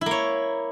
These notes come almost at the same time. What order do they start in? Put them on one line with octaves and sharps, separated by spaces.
E4 A#3 C#5